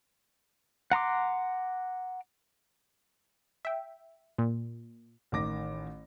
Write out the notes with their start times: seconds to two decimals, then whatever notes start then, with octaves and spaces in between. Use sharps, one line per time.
0.92 F#5 A#5 C6 D6
3.65 E5 G5
4.38 A#2
5.32 A1 D#3 D6 A#6